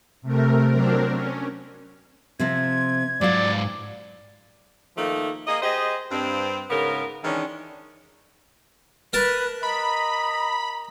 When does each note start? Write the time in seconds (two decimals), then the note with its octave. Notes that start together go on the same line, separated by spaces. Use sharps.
0.22 C3 A3 A#4
0.71 F#3 C4 D4 A#4
1.10 C#4
2.39 C3 F3 C4 G#6
3.21 G#2 F#3 F4 D5 F5
4.96 D#3 F3 A3 A#3 D#4
5.47 A#3 G#4 D#5
5.62 G4 G#4 C5 D#5
6.10 G2 C4
6.69 G#2 C#3 B3 A#4
7.24 D#3 E3 G#3 C#4 D4
9.13 A#4 B4 A5
9.63 D#5 A#5 B5